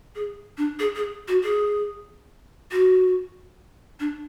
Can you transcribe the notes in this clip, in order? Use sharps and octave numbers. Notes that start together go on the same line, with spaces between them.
G#4
D4
G#4
G#4
F#4
G#4
F#4
D4